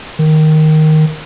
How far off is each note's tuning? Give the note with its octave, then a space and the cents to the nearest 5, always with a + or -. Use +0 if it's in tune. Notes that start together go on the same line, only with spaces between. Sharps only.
D#3 +0